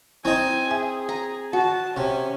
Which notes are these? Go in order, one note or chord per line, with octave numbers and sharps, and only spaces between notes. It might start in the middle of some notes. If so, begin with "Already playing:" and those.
C4 D#4 E4 G#5
G#4 E5 G#5
A#5
F#4 A5
C3 C#4